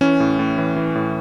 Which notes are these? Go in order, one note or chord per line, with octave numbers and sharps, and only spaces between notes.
E3 C#4
A2
A2
E3
E3
A2